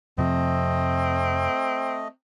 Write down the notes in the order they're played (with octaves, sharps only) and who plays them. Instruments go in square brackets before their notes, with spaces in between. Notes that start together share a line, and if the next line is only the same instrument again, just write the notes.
[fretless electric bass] F2 C3 F3 [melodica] A3 D#5 [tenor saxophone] C4